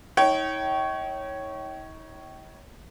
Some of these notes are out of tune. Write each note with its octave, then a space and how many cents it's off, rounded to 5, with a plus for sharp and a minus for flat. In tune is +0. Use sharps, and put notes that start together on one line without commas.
D#4 +40 C#5 +0 G5 -30